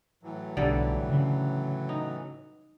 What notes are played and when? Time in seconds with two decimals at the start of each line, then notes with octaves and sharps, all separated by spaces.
0.23 A2 E3 F#3
0.57 B1 D3 G3 A4
1.09 C#3
1.89 D#4